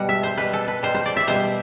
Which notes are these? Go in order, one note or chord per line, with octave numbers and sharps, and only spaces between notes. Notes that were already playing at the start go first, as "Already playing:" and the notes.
Already playing: B2 G3 F#5
E5
C5
B2 G3 B4
A4
B4
B2 G3 C5
C5
D5
E5
B2 G3 C5